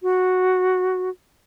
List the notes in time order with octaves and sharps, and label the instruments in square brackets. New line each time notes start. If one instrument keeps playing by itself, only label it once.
[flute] F#4